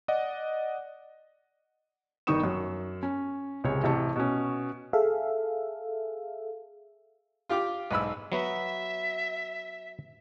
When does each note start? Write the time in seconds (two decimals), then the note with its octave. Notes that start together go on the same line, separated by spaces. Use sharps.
0.08 D5 D#5 F#5
2.27 G1 D#3 D#4 C#6 D#6 E7
2.43 F#2
3.03 C#4
3.64 C#2 C3 G#3 C#5
3.83 A1 C3 E4 C#5 A5 C#6
4.16 B2 C#4
4.93 G#4 A4 E5 F5
7.49 F4 G4 F5 G5 D6
7.91 B1 G#2 B5 E6
8.32 F#3 B3 F#4 E5